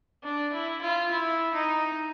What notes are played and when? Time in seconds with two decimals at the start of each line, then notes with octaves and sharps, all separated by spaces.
0.23 D4
0.53 E4
0.81 F4
1.11 E4
1.54 D#4